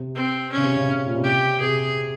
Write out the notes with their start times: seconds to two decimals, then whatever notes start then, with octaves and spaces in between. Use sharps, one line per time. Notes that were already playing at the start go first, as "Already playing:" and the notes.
Already playing: C3
0.15 C4
0.52 C#4
0.57 C#3
0.64 C3
0.77 C#3
0.88 C#3
1.06 A#2
1.15 C3
1.24 G4
1.60 C3 G#4